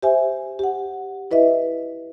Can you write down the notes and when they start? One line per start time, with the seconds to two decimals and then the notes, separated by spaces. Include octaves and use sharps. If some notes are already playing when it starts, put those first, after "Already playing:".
0.03 G4 C5 E5 G#5
0.59 G4 F#5
1.31 E4 B4 D#5 E5